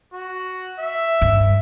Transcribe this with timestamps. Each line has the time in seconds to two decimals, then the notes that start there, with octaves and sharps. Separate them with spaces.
0.14 F#4
0.80 E5
1.22 G2